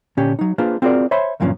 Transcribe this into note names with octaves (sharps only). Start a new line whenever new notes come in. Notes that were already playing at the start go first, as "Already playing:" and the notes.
A#2 D3 C#4 D4 G4
F#3 D#4
A#3 D4 F4 G#4 B4 C5
C4 F4 F#4 G#4 A#4 D5
C5 C#5 E5 G#5 B5 C6
D2 G2 A#2 F3 F#3 C#4